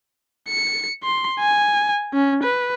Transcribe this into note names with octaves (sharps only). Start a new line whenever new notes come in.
C#7
C6
G#5
C#4
B4